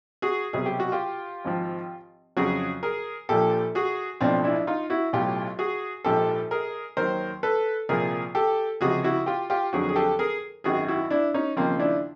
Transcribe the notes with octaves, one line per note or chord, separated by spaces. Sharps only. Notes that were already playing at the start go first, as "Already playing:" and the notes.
F#4 G#4
C2 B2 F#3 G#4
G4
F#4
F4 G4
G#1 G#2 F3
F2 C#3 F#3 F#4 G#4
G#4 A#4
A#1 A#2 F3 G4 A4
F#4 G#4
B1 A2 F3 C4 D4
D4 E4
D#4 F4
E4 F#4
B1 A2 F#3 F4 G4
F#4 G#4
A#1 G#2 F3 G4 A4
G#4 A#4
D#2 D#3 F#3 A#4 C5
A4 B4
C2 A#2 F3 G#4 A#4
G4 A4
C#2 C3 F3 F#4 G#4
E4 F#4
F4 G4
F4 G4
F2 D3 F#3 F#4 G#4
G#4
G4 A4
G#4 A#4
G#1 F#2 D#3 F#4 G#4
E4 F#4
D4 E4
C#4 D#4
D#2 C#3 F3 A#3 C4
D4 E4